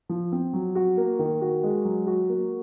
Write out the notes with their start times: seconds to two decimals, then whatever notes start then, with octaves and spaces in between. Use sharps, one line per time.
0.09 F3
0.32 C4
0.53 F#3
0.75 F#4
0.97 A#3
1.19 D#3
1.41 F#4
1.63 G#3
1.85 F#3
2.07 F#4
2.29 A#3